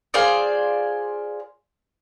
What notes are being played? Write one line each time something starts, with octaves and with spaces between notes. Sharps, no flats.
F4 G#4 C5 D5